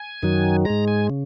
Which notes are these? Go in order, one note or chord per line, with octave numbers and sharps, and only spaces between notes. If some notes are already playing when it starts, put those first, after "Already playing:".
Already playing: G#5
F#2 D#3 F#3
G#2 G#3 A#5
G#5
C#3